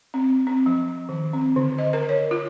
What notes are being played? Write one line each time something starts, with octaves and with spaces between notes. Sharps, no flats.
C4
C4
F3
D#3
C4
D3
D#5
A#4
C#5
F4